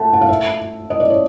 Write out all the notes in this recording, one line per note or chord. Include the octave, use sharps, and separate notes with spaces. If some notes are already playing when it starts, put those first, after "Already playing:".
Already playing: A3 F#5 A5
F#5
F5
E5
D#5
D5
C#5